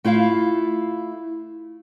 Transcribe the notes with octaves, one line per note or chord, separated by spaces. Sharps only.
A3 E4 F4 F5